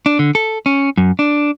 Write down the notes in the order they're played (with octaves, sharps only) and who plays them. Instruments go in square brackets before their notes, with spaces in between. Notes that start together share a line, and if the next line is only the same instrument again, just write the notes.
[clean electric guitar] D4
D3
A4
C#4
F#2
D4